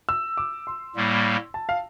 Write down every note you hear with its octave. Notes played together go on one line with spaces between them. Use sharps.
E6
D6
C6
A2 G3 A#3
A5
F5